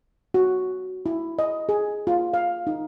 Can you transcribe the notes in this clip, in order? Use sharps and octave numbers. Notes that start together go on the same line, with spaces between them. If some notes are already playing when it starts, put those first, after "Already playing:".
F#4
E4
D#5
G#4
F4
F5
D#4